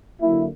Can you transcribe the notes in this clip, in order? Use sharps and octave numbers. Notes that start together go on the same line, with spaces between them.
D3 F#3 A#3 E4